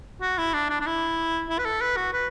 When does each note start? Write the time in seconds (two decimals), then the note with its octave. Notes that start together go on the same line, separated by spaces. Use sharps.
0.22 F#4
0.38 E4
0.53 D4
0.70 D4
0.80 D4
0.86 E4
1.49 E4
1.59 B4
1.65 A4
1.81 B4
1.97 F#4
2.13 B4